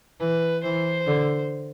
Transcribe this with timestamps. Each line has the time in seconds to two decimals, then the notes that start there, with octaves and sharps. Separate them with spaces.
0.20 E3 B4
0.64 E3 C5
1.07 D3